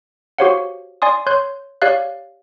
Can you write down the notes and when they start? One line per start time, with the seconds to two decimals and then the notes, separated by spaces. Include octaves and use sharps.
0.38 F#4 G4 C5 C#5 F5 F#5
1.02 D5 G#5 C6 D#6
1.26 C#5 C6 F#6 G6
1.82 G4 C#5 D5 F5 F#6